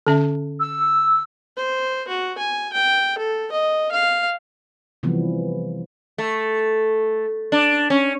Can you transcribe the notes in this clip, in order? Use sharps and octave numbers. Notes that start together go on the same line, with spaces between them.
D3 C#4 E5
E6
C5
F#4
G#5
G5
A4
D#5
F5
C3 E3 F3 G3 B3
A3
D4
C#4